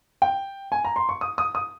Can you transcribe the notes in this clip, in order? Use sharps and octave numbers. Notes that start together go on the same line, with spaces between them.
G5
G#5
A#5
C6
C#6
D#6
D#6
D#6